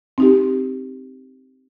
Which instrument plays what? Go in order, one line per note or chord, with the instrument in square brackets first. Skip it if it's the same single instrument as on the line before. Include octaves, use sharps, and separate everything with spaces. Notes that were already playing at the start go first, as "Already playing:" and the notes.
[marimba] C4 D#4 G4